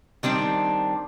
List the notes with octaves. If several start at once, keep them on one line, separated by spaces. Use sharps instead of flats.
D#3 G3 C4 D4